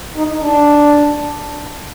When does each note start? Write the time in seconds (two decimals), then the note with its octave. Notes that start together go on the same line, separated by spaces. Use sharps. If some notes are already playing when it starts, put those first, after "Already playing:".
0.16 D#4
0.40 D4